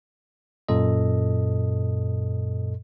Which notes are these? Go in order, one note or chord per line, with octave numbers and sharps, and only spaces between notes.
F#2 A#2 A4 D#5